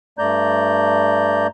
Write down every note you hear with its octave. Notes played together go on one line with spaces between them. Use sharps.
G2 A3 D5 A#5 G6